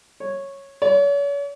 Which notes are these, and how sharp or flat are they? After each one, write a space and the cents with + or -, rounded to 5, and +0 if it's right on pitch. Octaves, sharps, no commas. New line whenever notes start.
C#5 -10
C#5 +40